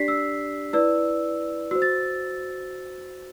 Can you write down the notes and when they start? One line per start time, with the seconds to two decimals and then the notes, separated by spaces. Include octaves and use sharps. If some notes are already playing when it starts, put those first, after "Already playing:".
Already playing: D4 G4 D5 B6 C7
0.08 E6
0.73 E4 B4 D5 E6
1.71 F#4 C5 E6
1.82 A6